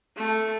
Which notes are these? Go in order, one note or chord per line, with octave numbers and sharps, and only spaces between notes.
A3